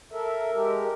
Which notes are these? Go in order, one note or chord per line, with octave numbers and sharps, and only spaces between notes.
A4 A#4 E5
G#3 G4 A#4